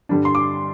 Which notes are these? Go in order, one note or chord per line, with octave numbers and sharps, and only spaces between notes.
G2 D3 G3 D4
C6
D6